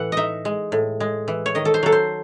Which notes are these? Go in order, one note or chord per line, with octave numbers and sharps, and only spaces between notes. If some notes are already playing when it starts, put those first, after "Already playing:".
Already playing: A2 E3 F#5
D#4 D#5 E5
G#3
A2
G#3
E3
C#5
D#3 D#5
A4
C5
F#3 A4
C5